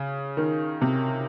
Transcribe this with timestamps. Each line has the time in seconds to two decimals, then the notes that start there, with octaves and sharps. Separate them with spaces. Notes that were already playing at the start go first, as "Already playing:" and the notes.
Already playing: C#3
0.37 D#3
0.82 C3